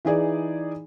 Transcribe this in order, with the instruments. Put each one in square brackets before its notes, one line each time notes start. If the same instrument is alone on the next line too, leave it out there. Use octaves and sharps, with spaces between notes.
[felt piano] E3 D#4 G#4 D5